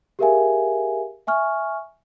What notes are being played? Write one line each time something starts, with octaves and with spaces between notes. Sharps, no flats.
G4 G#4 A#4 E5 F5 G#5
E5 G#5 C#6 F6